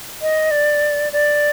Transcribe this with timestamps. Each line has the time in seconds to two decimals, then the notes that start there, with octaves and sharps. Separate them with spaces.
0.22 D#5
0.51 D5
1.13 D5